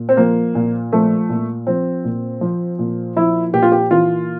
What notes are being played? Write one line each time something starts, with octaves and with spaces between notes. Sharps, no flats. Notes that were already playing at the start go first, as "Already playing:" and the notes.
Already playing: A#2
C4
F3 A#3
A#2
F3 A3
A#2
F3 C4
A#2
F3
A#2
F3 E4
A#2 G4
F4
G4
E3 F4